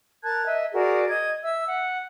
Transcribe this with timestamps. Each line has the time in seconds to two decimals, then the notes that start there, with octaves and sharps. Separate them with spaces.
0.24 A#4 A5 F#6 G#6
0.47 D#5 E5
0.74 F#4 G#4 A#4 D5
1.09 D#5 G#6
1.43 E5 E6
1.68 F#5